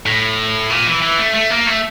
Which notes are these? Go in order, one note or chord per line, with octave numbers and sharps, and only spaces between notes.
A2
A#2
E3
E3
A3
A3
A#3
A3